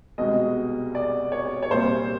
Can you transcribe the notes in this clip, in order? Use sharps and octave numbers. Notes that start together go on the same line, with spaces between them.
C2 B2 G#3 D#5
D5
C#5
C#5
C2 A#2 G3 C5